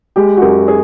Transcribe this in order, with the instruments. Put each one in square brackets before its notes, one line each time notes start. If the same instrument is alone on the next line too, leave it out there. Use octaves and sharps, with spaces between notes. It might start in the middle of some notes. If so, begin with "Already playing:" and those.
[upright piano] G#3 G4
F#4
F#2 G4
G#4